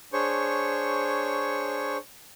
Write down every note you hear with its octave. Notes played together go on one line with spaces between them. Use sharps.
D4 G#4 C5 C#5 C#6